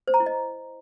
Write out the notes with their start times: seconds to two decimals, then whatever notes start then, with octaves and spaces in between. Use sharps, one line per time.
0.08 C5
0.14 A#5
0.20 E4
0.26 D#5